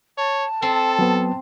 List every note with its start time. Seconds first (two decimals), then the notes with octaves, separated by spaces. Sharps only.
0.18 C#5 A5
0.62 C4 A4
0.99 F#3 B3